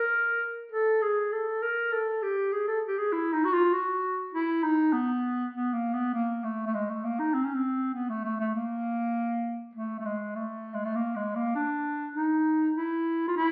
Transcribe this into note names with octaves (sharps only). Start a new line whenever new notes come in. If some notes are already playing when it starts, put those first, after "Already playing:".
Already playing: A#4
A4
G#4
A4
A#4
A4
G4
G#4
A4
G4
G#4
E4
D#4
F#4
F4
F#4
E4
D#4
B3
B3
A#3
B3
A#3
A3
A3
G#3
A3
A#3
D#4
C4
C#4
C4
B3
A3
A3
A3
A#3
A3
A3
G#3
A3
G#3
A3
A#3
G#3
A#3
D4
D#4
E4
F4
E4